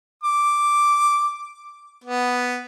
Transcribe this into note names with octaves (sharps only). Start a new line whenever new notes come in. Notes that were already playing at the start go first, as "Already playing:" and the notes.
D6
B3